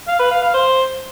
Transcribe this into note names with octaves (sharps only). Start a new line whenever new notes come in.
F5
B4
F5
F5
C5